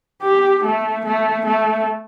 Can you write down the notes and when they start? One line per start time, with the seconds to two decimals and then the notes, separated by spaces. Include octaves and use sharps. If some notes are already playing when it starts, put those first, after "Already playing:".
0.22 G4
0.64 A3
1.05 A3
1.45 A3